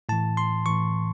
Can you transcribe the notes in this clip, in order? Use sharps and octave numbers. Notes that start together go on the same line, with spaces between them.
A2 E3 A5
C6
A2 E3 C#6